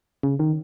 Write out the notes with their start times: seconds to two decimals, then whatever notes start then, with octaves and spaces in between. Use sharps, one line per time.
0.23 C#3
0.39 D#3